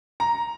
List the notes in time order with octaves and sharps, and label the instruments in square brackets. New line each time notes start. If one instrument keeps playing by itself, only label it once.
[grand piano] A#5